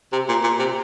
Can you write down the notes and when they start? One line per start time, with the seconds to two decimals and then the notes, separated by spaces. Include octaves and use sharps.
0.13 C3
0.29 A#2
0.43 A#2
0.60 C3